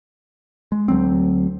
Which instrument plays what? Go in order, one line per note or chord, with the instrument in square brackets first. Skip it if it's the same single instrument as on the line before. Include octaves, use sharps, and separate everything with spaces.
[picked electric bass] G#3
D2 F#3 C4